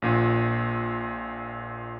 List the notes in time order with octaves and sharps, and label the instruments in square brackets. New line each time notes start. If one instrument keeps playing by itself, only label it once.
[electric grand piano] A#1 A#2